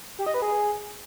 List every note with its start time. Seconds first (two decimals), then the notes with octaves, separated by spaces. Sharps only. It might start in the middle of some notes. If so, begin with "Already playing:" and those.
0.19 G4
0.26 D#5
0.34 B4
0.42 G#4